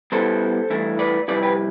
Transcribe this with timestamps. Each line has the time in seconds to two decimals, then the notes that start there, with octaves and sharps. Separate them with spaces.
0.12 B2 G3 B3 E4 A4 C5
0.70 G2 E3 A3 E4
0.99 B4 D5
1.28 F2 C3 G3 C4 E4 B4 D5
1.42 G4 B4